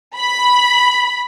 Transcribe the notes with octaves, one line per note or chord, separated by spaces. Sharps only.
B5